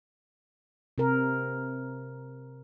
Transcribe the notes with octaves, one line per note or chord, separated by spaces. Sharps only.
C3 A#4